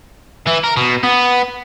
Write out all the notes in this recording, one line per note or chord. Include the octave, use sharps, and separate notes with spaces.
E3
A#4
B2
B3